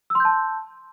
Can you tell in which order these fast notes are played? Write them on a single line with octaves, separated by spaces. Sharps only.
E6 C6 G6 A5